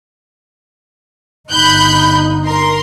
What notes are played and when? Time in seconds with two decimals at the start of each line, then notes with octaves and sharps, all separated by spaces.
1.50 G1 D#4 B5 F#6 G6
2.45 A#4 C6